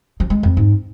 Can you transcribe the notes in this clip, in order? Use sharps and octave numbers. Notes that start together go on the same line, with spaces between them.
F3
G#3
F2
G#2